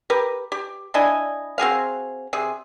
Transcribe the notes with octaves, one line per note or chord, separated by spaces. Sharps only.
G4 A#4 B4
G4
D4 E4 D#5 G#5
C4 F#4 G#4 F5
C3 G#4